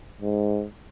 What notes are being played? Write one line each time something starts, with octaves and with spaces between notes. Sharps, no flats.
G#2